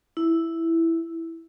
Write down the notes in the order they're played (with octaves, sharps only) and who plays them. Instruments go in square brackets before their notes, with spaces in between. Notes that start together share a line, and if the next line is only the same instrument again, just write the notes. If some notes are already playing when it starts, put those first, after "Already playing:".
[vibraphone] E4